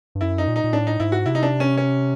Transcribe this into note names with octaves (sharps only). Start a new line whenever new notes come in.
G2
F#2 E4
D#4
A#2
D#4
A#2
A2 D4
D#4
G#2 E4
F#4
C3 E4
D#4
D4
C#4
C#4